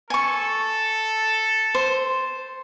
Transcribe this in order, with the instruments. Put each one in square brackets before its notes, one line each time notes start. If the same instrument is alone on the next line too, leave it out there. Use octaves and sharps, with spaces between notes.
[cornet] A4 [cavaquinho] G#5 C#6
[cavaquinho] C5